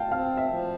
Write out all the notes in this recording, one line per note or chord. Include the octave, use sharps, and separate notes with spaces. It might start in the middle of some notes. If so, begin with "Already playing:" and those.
Already playing: F5 G5 A5
C4 F5
E5
F3